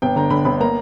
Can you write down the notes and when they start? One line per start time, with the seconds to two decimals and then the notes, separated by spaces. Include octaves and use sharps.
0.02 G1 G5
0.16 D3 A#5
0.30 D3 B5
0.45 G1 B5
0.60 A#3 A#5